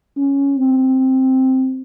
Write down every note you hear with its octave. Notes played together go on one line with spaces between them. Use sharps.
C#4
C4